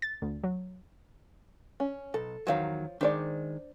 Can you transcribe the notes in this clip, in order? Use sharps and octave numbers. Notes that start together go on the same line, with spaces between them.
A6
D2
F#3
C#4
B1 A4
E2 D#3 F3 F#3 C#5 F5
D#3 G#3 D4 C5 D5